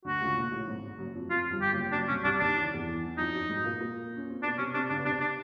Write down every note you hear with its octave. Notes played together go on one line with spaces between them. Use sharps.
D2 D3 F#4
C#2 C#3
A#1 A#2
A1 A2
G#1 G#2
F#1 F#2
F2
F2 F4
G1 G2
G4
F#1 F#2
F#1 F#2 D4
C2 C3 C#4
C2 C3 D4
D#2 D#3 D4
E3
D#3
E2 E3
E3
F2 F3 D#4
F#2 F#3
G#2 G#3
A#2 A#3
A#2 A#3
C#4
C4
B2 B3 D4
C3 C4 C#4
C3 C4 D4
C#3 C#4 D4
B3
C3 C4 D4
D4